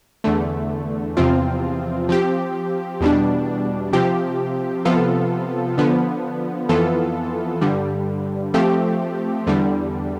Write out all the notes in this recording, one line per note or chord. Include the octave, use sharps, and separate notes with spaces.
E2 D3 A3
E2 C3 F3 C4 F4
F3 C4 G4
E2 B2 G3 D4
C3 F3 C4 G4
C3 F3 B3 F4 A4
D3 F3 B3
F2 E3 B3 F4 A4
G2 D3 G3
F3 A3 C4 G4
E2 D3 G3